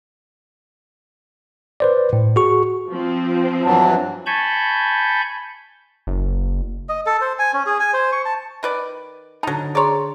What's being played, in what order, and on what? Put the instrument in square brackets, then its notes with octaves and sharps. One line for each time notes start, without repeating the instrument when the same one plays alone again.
[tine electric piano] B4 C5 D5
A2
F#4 G#4 C#6
[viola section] F3 C4
[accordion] G2 E3 F#3 [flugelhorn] A5
[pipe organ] G#5 A5 B5 C#6 G6
[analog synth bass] F#1
[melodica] D#5
A4
C5
G#5
C#4
G#4
G#5
C5
C#6
A5
[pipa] D#3 B4 D5
[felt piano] D3 A5 [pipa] F#3 D#4
[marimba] G#4 A#5 C6 [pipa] C#5 D5